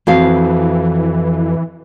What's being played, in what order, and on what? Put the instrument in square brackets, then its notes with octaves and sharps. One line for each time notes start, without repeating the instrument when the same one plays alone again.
[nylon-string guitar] F2 F#4 F5 [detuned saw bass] E3